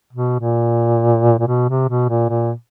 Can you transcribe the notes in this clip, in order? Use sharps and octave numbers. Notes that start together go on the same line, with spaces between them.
B2
A#2
A#2
B2
C3
B2
A#2
A#2